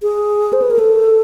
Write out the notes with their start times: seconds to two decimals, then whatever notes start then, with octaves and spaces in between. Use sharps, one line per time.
0.03 G#4
0.53 C5
0.62 B4
0.71 A#4
0.79 A4